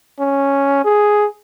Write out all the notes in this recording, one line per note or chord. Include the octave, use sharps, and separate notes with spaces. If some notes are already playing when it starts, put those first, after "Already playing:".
C#4
G#4